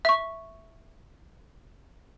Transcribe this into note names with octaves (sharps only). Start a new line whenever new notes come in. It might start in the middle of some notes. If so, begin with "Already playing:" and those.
E5 C#6